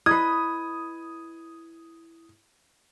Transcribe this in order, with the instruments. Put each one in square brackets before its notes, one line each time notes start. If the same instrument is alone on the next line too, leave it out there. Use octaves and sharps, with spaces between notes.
[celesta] E4 G#6 [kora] B4 D#5 [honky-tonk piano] D#6